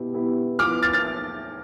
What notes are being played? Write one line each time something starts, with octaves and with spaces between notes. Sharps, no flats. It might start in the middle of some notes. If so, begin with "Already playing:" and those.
Already playing: B2 B3 E4 G4
B2 B3 E4 G4
F3 B3 E4 D6 F6
F6 A6
F6 A6